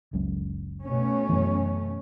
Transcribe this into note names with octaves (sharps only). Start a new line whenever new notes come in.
F#1 C#2 F#2
B2 A3 C#4
F#2 E3